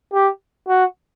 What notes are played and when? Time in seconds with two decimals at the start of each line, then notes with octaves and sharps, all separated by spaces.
0.13 G4
0.68 F#4